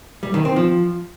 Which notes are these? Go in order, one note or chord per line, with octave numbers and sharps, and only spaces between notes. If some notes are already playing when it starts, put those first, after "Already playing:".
G3
D#3
C4
F3